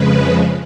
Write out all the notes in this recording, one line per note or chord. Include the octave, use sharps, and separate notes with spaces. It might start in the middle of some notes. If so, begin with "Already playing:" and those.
Already playing: F2 C#3 F3 G#3 B4